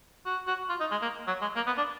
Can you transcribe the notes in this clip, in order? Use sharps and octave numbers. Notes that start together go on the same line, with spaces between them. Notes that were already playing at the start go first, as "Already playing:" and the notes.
F#4
F#4
F4
D#4
G#3
A#3
F#3
G#3
A#3
B3
D4